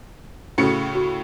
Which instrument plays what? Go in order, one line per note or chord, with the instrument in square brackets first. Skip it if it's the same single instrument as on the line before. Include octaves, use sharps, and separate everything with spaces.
[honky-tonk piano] A2 C#3 C#7 [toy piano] C#4 F#4 A4
[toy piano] F#4